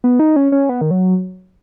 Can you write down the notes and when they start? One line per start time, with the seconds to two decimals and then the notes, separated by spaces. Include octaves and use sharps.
0.04 B3
0.19 D#4
0.36 C#4
0.52 C#4
0.69 B3
0.81 D#3
0.91 F#3